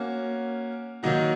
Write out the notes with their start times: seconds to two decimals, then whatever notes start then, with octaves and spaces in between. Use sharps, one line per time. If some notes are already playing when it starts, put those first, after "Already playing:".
Already playing: A#3 C#4 F#4
1.03 D#3 F#3 A#3 D#4 F#4